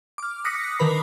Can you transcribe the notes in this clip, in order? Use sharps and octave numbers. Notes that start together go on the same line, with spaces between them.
D6 F6
D6 D#6 F#6 A#6 B6 C#7
D3 D#3 A#4 B4 B5 C7